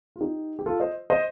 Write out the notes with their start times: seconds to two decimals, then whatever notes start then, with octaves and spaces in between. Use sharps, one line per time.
0.16 F4
0.20 D#4 G4
0.59 G4
0.66 F4 A4
0.80 C5 D#5
1.10 C5 D#5